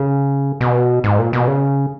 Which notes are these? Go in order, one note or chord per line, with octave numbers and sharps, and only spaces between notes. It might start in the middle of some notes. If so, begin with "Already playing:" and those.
Already playing: C#3
B2
G#2
A#2
B2
C#3